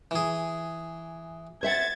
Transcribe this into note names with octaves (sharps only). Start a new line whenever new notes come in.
E3 G#4
C5 E5 F#5 G#6 A6